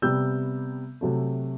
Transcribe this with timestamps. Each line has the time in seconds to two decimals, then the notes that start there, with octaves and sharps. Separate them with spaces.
0.02 C3 G3 B3 E6 G6
1.01 C3 F#3 A3